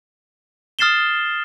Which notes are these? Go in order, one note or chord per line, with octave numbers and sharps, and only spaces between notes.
D#6 F6 A6 C7 E7 G7